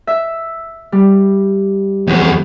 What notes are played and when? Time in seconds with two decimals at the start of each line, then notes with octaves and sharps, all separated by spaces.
0.07 E5 E6
0.92 G3
2.08 E2 F3